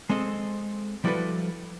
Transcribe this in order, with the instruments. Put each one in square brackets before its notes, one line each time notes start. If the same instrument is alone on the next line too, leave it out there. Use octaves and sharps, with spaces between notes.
[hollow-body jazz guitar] G#3 C4 A4 D#5
F3 G3 E4 F#4 A4 B4